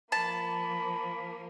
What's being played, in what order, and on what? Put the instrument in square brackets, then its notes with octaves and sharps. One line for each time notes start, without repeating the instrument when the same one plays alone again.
[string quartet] F3 A#3 [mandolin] A5 [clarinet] B5